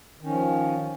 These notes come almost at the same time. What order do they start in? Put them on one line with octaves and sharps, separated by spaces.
D#3 C#4 F3